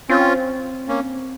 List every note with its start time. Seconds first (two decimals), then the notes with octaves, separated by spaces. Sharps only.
0.09 C4 C#4 F4
0.88 A#3 C#4